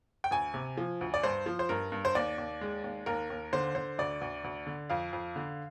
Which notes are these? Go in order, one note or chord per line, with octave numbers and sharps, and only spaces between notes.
G5
D2 G#5
C3
F3
D2
D5
G2 C5
F3
C5
G2 A#4
G2
C5
D#2 D5
D#2
G#3
D#2
D#2 A#4
D#2
D3 C5
D3 C5
D2 D5
D2
D2
D3
F2 F5
F2
D3